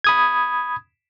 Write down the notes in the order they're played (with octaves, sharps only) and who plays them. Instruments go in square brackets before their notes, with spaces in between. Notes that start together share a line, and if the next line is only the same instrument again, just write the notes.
[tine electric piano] B5 D#6 G#6